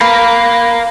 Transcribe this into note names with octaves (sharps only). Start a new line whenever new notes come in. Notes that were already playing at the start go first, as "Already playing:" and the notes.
A#4 B4 F5